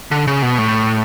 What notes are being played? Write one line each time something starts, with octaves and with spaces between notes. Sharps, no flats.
D3
C#3
B2
A2